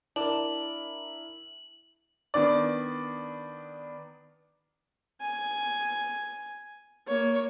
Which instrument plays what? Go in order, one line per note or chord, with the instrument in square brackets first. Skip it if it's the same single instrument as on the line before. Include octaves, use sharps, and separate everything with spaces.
[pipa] D4 [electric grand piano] E4 A#4 [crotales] F#7
[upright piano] D#3 B3 D4 D5
[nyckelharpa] G#5
A#3 C#5